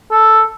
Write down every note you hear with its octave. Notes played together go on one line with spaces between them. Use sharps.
A4